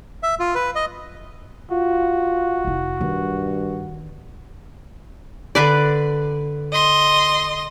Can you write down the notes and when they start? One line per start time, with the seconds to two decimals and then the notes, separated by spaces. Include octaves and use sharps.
0.23 E5
0.40 F4
0.55 B4
0.75 D#5
1.71 F4 F#4
2.65 F1 E4
3.01 G2 D#3
5.55 D3 B4 D5
6.72 D#5 C6